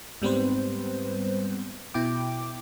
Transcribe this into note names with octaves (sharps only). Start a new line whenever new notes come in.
G#2 G3 B3 C4 B4 C5
B2 E4 G5 D6